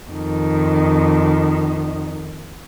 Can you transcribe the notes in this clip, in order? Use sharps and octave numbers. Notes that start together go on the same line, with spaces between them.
F2 D#3